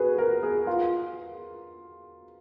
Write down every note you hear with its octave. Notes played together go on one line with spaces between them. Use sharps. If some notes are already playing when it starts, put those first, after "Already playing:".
Already playing: F#4 G#4 B4
A#4
G#4
F4